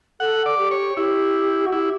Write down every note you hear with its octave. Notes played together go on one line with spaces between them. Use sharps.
A4 F#5
D5
G4
C#5
E4 G4
F#4
E4 G4